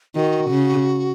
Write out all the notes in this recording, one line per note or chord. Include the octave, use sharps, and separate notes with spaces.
D#3 F#4
C#3